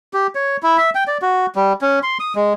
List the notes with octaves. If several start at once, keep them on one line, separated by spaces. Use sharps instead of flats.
G4
C#5
E4
E5
G5
D5
F#4
G3
C#4
C6
D#6
G#3